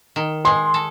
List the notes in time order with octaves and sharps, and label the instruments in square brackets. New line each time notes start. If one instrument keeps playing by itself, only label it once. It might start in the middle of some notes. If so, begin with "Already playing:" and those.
[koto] D#3
[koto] G#3 [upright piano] C6
[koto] A4